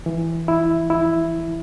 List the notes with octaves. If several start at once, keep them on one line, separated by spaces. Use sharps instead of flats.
E3
E4
E4